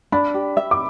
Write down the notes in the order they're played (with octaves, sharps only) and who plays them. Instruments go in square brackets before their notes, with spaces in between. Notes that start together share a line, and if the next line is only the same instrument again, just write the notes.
[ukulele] D4 [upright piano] B5
[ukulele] G4
E5
[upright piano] D6